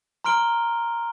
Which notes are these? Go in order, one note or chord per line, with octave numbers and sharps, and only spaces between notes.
A#5 C6 F6 D7 G7